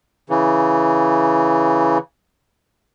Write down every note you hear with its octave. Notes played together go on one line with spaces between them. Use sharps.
C#3 E3